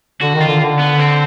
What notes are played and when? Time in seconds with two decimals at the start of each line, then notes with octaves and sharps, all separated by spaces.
0.21 D3 F#4
0.34 D#3
0.41 F4
0.47 D3
0.60 D3
0.79 B3
0.99 C4